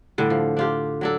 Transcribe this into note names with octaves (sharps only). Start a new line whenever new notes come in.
A2 D3 G3
F3
D4 F4 G4
F#3 D4 A4